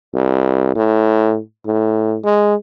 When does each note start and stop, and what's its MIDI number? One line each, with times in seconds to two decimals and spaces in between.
0.14 0.73 36
0.75 1.38 45
1.66 2.17 45
2.24 2.55 56